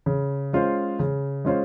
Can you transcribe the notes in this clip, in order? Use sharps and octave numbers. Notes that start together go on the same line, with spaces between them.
C#3
G#3 C#4 F4 C5
C#3
G#3 C#4 F4 C5